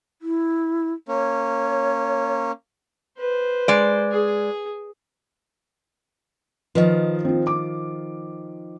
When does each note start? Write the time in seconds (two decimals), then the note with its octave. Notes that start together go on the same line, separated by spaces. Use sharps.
0.22 E4
1.08 A#3 C#4 C#5
3.18 B4 C5
3.68 G#3 D5
4.11 G#4
6.75 D#3 F3 B4 D#5
7.24 C4 F4
7.47 D6